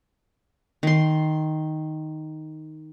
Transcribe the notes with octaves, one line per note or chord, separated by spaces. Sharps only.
D#3 C6